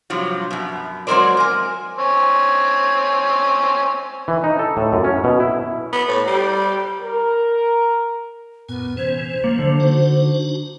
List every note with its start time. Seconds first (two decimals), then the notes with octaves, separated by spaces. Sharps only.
0.10 G2 C3 F3 F#3
0.51 F#2 B2
1.07 F#3 G#3 C4 A#4 C5 D5
1.37 A#4 G#5
1.98 C4 C#5 G#5
4.28 E3
4.44 D#4
4.59 A4
4.77 A2
4.93 F#2
5.04 C#4
5.24 B2
5.40 E4
5.93 B3
6.08 A2
6.27 G3
7.02 A#4
8.69 F#2 A#2 B3 G#5
8.97 C3 E3 C#4 C5
9.44 C#3 F3 F#3 A#3
9.59 D3
9.80 D4 D#4 F#4